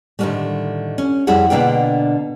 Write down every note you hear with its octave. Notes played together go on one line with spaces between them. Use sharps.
A2 D3 D#3 F#3 G3 A3
C#4
F2 G3 E4 G#4 F#5
B2 D3 A#3 D4 F4 G5